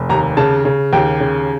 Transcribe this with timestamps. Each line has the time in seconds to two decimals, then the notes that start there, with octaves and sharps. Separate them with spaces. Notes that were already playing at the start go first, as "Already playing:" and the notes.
Already playing: F1
0.09 D#2 A#5
0.37 C#3 A5
0.65 C#3
0.93 D#2 G5
1.20 C#3